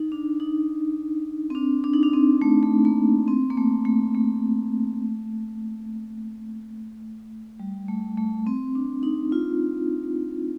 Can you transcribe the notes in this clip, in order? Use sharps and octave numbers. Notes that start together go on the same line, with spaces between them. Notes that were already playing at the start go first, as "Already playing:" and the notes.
Already playing: D#4
D4
D#4
C4
D4
D4
D#4
D4
C4
A3
A3
A#3
C4
A#3
A3
A3
A3
G3
A3
A3
C4
D4
D#4
F4